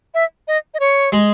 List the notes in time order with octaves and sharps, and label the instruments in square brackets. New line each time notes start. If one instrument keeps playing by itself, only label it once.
[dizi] E5
D#5
D#5
C#5
[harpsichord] G#3